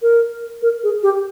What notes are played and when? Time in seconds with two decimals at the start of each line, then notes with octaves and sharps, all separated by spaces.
0.02 A#4
0.62 A#4
0.83 G#4
1.03 G4